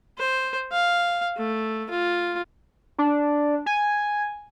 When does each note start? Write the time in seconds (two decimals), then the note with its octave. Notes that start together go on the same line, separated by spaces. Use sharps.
0.18 C5
0.72 F5
1.37 A3
1.89 F4
2.98 D4
3.66 G#5